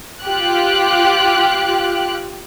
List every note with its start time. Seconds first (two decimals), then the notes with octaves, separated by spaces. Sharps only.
0.24 F4 G4 F#6